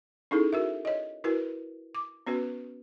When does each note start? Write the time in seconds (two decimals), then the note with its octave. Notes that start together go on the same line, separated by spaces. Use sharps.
0.31 C#4 D#4 E4 G#4 A4
0.53 F#4 A#4 E5
0.85 C#5 D#5
1.24 E4 F#4 A#4 B4
1.95 D6
2.27 B3 C#4 F#4 B4